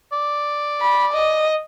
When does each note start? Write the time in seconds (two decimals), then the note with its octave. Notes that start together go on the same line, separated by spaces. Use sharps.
0.13 D5
0.81 B5
1.13 D#5